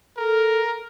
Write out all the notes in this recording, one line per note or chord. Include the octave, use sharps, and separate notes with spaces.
A4 A#4